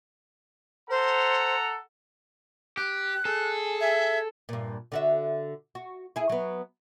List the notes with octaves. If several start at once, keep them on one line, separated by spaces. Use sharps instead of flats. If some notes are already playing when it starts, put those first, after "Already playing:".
A4 C5 F#5 A#5
G4 F#6
G#4 A4
E5 G#6
G2 A#2
D3 F#4 E5
F#4
E4 G#4
F#3 B3